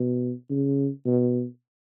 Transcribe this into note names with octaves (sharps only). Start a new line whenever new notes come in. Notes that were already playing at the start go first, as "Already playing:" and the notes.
Already playing: B2
C#3
B2